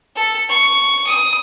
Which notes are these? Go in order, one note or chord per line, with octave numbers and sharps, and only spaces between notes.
A4
C#6
D#6